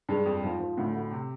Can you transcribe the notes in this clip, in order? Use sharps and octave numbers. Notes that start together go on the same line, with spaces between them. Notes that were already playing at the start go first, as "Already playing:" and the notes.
G2 G#3
F2
G#2 F3
F3
D2 A2
D2
C3